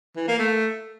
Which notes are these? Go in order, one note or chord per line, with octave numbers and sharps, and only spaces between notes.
E3
A#3
A3